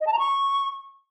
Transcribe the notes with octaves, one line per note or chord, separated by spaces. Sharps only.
D#5
A5
A#5
C#6